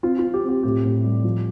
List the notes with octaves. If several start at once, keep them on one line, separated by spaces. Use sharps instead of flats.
C4 F4
C4 F4
G4
C4 G4
A2 G4
A2
G3
F3